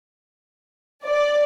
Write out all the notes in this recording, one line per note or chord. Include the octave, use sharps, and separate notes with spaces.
D5